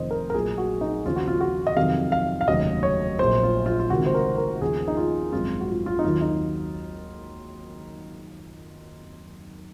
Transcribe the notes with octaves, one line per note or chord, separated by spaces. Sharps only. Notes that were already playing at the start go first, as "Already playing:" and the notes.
Already playing: F1 F2 D#3 C5 D#5
A#4
A#4
A#1 A#2 F#3 G#4
F#4
D#4
D#2 C#3 F3 F4
F#4
F4
F#4
D#5
F2 C3 D#3 F#3 F5
F5
F5
F1 D#2 C#3 F#3 D#5
C#5
A#1 A#2 F#3 C5
F4
F4
F4
C#2 C3 D#3 F#4
C5
A#4
A#4
D#2 C#3 F3 G#4
D#4
F4
G#1 F#2 F3 F4
F#4
F4
F4
D#4
D#2 D#3 F#3 F4
D#4